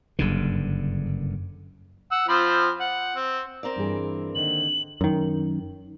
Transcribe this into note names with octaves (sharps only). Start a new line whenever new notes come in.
F#1 G2 D3
F#5 E6
F3 C4 B5
F#5
C4
C4 A#4 D5
G2 E3 G#4
D3 D#3 A#3 F#7
F#2 D#3